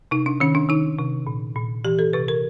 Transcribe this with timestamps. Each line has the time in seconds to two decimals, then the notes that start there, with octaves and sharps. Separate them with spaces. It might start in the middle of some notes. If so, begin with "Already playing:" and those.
0.11 C3 D#4
0.26 D4
0.40 D#3 C#4
0.55 D4
0.69 D#3 D#4
0.98 C3
1.27 A#2
1.56 A#2
1.85 E3 G4
1.99 A4
2.13 C3 B4
2.28 A#4